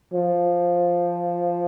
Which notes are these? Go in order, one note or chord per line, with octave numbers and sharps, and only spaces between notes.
F3